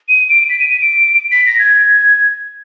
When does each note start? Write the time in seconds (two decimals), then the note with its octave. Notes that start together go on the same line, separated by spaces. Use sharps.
0.08 D#7
0.29 D7
0.50 B6
0.59 D#7
0.70 D#7
0.81 D7
1.32 B6
1.46 A#6
1.59 G#6